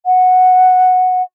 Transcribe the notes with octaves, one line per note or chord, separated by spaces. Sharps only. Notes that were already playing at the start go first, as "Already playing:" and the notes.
F#5